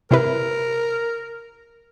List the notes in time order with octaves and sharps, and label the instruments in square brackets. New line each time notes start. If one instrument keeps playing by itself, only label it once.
[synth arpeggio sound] C3 E4 B4 [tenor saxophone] A#4